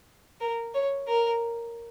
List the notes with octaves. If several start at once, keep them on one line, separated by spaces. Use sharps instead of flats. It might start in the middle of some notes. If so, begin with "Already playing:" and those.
A#4
C#5
A#4